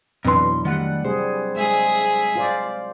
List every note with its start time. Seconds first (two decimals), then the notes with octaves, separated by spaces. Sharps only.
0.25 F2 B2 E3 F#3 D4 E4 C6
0.65 D#3 G3 A3 F#5
1.05 C3 G3 G#4 C5
1.56 G#3 G#4 E5
2.36 F4 C5 D5